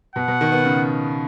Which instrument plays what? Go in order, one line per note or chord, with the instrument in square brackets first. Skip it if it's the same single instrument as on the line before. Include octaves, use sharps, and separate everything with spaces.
[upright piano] B2 [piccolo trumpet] F#5
[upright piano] B2
D#3
B3
C#3